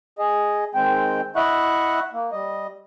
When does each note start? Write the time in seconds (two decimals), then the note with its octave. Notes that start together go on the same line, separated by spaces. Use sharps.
0.19 G#4 D#5
0.75 D#3 G#3 C4 G5
1.36 E4 D#5 E5 F#5 C#6 F#6
2.13 A#3
2.32 G3 D#5